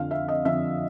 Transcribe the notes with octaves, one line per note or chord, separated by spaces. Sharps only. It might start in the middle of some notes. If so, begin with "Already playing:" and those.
Already playing: F2 D3 F3 F5
E5
D#5
F2 D3 F3 E5